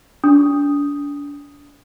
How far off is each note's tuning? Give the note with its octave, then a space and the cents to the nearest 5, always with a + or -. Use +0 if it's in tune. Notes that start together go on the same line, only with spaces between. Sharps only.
D4 -35 D#6 +0